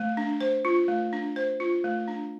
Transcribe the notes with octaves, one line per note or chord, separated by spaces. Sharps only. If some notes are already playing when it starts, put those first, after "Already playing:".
Already playing: A3
D4
C5
F4
A3
D4
C5
F4
A3
D4